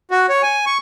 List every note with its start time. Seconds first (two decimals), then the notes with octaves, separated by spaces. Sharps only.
0.11 F#4
0.29 C#5
0.43 G#5
0.66 C#6